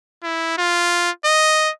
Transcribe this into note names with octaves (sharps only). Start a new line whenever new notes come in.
E4
F4
D#5